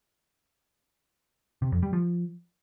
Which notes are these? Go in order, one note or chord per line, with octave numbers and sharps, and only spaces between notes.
C3
F2
G3
F3